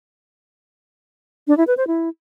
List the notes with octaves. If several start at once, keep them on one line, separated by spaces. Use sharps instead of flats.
D4
E4
B4
C5
E4